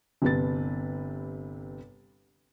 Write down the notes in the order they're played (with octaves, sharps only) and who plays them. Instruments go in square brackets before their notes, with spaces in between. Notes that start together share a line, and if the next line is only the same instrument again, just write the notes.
[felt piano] G1 C3 B4 A6